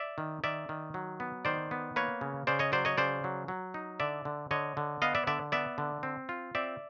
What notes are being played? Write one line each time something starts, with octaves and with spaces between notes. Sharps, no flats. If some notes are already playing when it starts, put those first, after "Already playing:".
Already playing: D5 E5
D#3
D#3 D5 E5
D#3
F#3
B3
D#3 C5 D5
B3
A#3 B4 C#5
C#3
C#3 C5 D5
C#5 D#5
F#3 C5 D5
C#5 D#5
C#3 C5 D5
F#3
F#3
D#4
D3 D5 E5
D3
D3 C#5 D#5
D3
B3 D#5 F5
D5 E5
D3 D5 E5
B3 D5 E5
D3
C4
F4
C4 D5 E5